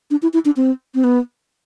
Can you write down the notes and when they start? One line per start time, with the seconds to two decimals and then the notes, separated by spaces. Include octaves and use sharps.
0.11 D4
0.22 E4
0.33 E4
0.45 D4
0.57 C4
0.95 C4
1.04 B3